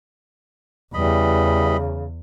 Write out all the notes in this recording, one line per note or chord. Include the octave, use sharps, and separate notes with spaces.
E2 C#3 E3 G3 D#5 B5